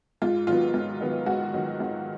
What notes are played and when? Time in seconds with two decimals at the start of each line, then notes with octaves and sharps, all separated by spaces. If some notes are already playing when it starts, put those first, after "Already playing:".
0.22 G#2 F4
0.47 D#3 F#3 B3 F4
0.74 G#2
1.01 D#3 F#3 B3
1.26 G#2 F#4
1.53 D#3 F#3 B3
1.80 G#2